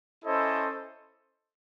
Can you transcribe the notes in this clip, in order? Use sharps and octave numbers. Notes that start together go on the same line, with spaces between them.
C#4 E4 A4 C5 D#5